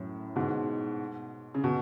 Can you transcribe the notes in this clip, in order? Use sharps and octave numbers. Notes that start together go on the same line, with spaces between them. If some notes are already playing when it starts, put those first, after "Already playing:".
Already playing: F#2 A2
G#2 B2
C#3
B2